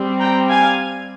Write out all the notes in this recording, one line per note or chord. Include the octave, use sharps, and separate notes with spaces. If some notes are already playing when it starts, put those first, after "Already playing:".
Already playing: G3 C4
G5 A#5
F5 G#5